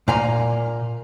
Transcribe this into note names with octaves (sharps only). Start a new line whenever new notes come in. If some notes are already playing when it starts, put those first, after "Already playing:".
A#2 A#3 G#5 A#5